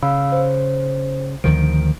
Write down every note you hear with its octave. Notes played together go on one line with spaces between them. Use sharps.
C#3 F5 B5 E6
C5
D2 D#3 F3 D7